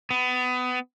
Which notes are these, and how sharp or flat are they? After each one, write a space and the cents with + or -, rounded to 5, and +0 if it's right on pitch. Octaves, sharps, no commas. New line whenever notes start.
B3 +25